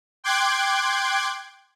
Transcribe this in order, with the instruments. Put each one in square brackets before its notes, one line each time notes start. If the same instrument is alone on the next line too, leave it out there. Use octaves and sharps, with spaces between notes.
[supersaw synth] G5 C6 D6 F#6 G#6